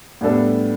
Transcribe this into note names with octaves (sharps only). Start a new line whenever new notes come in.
A2 G3 B3 D4 A4